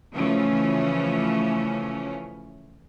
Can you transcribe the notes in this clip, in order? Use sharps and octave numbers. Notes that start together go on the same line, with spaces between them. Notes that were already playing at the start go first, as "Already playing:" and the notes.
C#3 E3 F3 A3 C#4